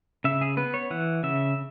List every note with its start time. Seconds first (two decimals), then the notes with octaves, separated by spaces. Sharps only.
0.24 C#3 E5
0.41 G#4
0.57 B3 B4
0.74 C#5
0.91 E3 F#5
1.23 C#3 E5